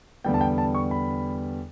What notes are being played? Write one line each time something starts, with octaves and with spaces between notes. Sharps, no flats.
E2 D3 G3 B3 G5
A5
G5
A5
C#6
B5